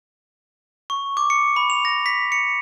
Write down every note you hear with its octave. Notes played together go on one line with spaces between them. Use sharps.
C#6
D6
C#7
B5
F7
A#6
B6
C#7